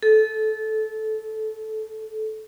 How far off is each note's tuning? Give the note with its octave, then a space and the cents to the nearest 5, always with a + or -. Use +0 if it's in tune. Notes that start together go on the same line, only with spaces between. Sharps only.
A4 -20